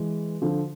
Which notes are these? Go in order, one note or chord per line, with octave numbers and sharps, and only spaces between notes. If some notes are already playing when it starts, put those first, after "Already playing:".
Already playing: E3 G#3
D3 F3